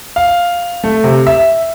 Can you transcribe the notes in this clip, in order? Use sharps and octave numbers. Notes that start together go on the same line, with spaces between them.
F5
A3
C3
E5